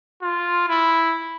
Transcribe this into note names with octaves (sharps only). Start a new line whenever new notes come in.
F4
E4